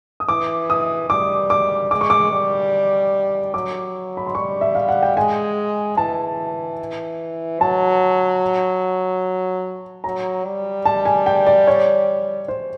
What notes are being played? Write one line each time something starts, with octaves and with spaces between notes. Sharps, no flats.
D#6
E3 D6
D#6
G3 D6
D6
G#3 D6
C#6
D6
G3
F#3 D6
B5
C6
G3 C#6
E5
F5
F#5
G5
G#3 G#5
E3 A5
F#3 A5
F#3 A#5
G3
A5
G#5
G5
D5
C#5
C5